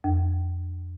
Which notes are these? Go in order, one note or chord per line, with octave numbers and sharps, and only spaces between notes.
F2